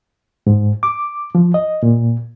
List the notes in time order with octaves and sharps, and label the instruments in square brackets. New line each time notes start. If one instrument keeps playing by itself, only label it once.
[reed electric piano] G#2
D6
F3
D#5
A#2